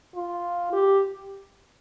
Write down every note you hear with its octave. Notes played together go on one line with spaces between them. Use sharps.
F4
G4